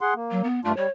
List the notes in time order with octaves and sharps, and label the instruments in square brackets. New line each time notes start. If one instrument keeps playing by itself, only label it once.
[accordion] G#4 F#5 C6
A#3
[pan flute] F#3
B3
[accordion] G2 D4 F4 [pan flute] A3
[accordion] G3 [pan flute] C#5